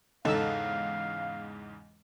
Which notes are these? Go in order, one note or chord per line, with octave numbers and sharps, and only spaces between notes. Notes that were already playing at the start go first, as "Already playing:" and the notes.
E2 G#2 C#3 D#4 A4 F5 A5 E6